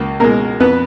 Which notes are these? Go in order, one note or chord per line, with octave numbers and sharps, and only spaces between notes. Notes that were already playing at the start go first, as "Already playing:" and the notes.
Already playing: C#2 A#3
B2 G#3 A#3 A#4
F2 B3 B4